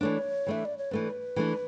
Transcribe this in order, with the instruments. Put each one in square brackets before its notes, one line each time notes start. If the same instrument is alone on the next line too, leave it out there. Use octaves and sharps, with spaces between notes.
[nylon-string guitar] E3 A3 D4 [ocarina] C#5
[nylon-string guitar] E3 A3 D4 [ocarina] E5
[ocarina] D5
C#5
[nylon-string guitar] E3 A3 D4 [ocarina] B4
[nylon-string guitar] E3 A3 D4